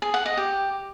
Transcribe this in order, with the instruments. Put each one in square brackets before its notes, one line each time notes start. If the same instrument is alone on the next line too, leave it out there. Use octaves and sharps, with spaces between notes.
[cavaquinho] G#4
F#5
D#5
G4